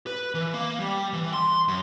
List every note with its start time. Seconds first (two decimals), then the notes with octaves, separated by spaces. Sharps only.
0.07 B4
0.34 E3
0.54 A#3
0.80 G3
1.13 E3
1.34 C6
1.68 F#2